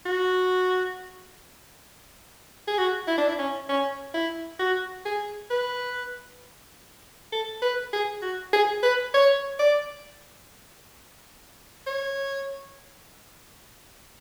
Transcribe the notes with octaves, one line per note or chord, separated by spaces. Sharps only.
F#4
G#4
F#4
E4
D4
E4
C#4
C#4
E4
F#4
G#4
B4
A4
B4
G#4
F#4
G#4
B4
C#5
D5
C#5